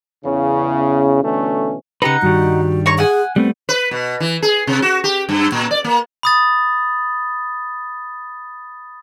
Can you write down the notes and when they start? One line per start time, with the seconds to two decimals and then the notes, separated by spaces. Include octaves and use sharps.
0.25 E2 C#3
1.22 B2 D3 E3 A3 C#4
2.02 C#3 D#4 G4 B4 F#5
2.22 G2 D#3 G3 F#4
2.86 C#5 A#5 C#6
2.98 G#4 F#5 G#5
3.36 G3 A3 B3 C4
3.69 B4
3.91 B2
4.20 E3
4.42 G#4
4.67 C3
4.82 F#4
5.04 G4
5.29 G2
5.52 A#2
5.71 D5
5.84 A#3
6.23 B5 D#6 A6